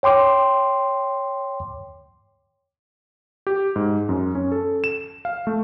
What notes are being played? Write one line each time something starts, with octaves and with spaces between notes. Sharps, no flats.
C#5 G5 C6 D6
G4
G#2
F#2
C#4
A4
E7
F5
A3